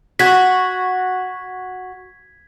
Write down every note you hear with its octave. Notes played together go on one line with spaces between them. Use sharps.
F#4 G#6 B6